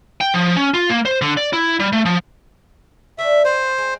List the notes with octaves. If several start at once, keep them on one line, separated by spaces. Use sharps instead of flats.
G5
F3
C#4
F4
A#3
C5
D3
D5
E4
G3
A3
F3
A3 D4 E5
F4 G#4 B4 C5
G#3 C4